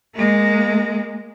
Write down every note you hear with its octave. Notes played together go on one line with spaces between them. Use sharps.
G#3 A#3